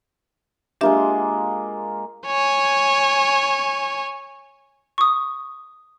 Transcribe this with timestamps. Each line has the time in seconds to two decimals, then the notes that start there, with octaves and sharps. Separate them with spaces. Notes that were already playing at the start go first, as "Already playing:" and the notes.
0.81 G#3 A#3 D4 F4 G4 E5
2.27 C#5 G#5
4.98 C#6 D#6